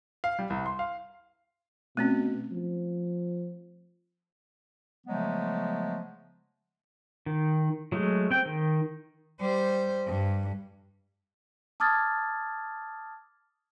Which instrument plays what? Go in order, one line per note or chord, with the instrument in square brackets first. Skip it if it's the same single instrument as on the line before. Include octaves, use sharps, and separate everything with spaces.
[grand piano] F5
G3
C2
C6
F5
[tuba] B2 [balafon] A3 C4 C#4
[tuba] F3
[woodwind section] C#3 F3 F#3 G#3 A3 B3
[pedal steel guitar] D#3
F#3 G#3 A3
C4 G5
D#3
[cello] G3 C5
G2
[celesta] A5 D6 D#6 F6 G#6 A6